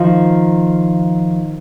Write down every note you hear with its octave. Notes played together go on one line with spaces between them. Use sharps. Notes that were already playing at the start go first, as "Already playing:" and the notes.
Already playing: D#3 F3